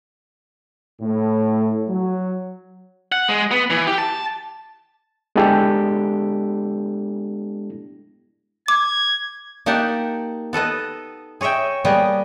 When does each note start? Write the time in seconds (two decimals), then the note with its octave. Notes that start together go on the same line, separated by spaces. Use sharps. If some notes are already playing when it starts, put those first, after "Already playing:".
1.01 A2
1.89 F#3
3.12 F#5
3.28 G#3
3.51 B3
3.70 E3
3.87 G4
3.98 A5
5.36 G#3 B3 D4 E4 G4 A4
8.68 D6 G#6
9.66 A#3 D#4 G4 F5 F#5 A5
10.53 B3 A4 B4 D#5
11.41 G#4 C#5 D#5 E5 G5
11.85 G3 A#3 B3 G#4 D#5